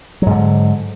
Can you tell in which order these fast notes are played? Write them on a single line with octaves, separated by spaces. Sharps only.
F#3 G#2 D3